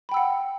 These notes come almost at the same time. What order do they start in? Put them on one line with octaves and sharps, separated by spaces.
B5 G5 E6 F#5